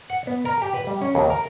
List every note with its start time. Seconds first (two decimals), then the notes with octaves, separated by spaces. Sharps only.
0.10 F#5
0.27 B3
0.45 A#4
0.62 G4
0.74 B4
0.87 G3
1.01 C#4
1.15 D#2
1.30 A#4